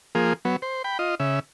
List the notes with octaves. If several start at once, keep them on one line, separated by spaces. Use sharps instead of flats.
F3 A#3 G#4
F#3 B3
C5
G5 B5
F4 D#5
C#3 E5